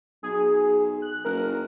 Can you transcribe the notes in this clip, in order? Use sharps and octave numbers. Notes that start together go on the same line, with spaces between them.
B1 G#4
F#6
F#1 A#4